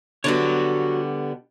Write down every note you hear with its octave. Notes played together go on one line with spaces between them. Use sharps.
D3 G3 B3 F#4 C#5